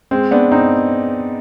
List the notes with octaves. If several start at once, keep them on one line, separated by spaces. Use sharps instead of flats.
G#3 C4
B3 D4
C4 D#4